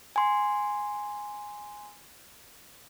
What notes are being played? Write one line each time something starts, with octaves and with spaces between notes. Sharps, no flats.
G#5 C6